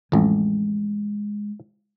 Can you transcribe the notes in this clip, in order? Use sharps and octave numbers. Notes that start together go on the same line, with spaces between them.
A1 F2 G#3